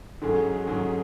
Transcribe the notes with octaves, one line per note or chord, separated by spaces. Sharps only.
G#2 D#3 F#3 C#4 G#4 A4
G#2 D#3 F#3 C#4 G#4